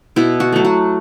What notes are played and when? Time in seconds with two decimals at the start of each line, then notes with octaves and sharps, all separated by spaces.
0.16 B2 E4
0.40 F#4
0.52 F#3 A3
0.65 F#4